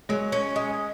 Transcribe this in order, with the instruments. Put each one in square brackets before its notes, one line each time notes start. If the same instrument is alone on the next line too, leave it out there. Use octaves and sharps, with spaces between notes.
[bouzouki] F#3 [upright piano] G#3
[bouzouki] C#4
G#3